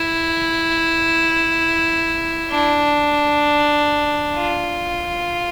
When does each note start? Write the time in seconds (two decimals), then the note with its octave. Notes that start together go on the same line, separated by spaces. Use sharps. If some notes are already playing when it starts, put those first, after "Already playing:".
Already playing: E4
2.50 D4
4.35 F4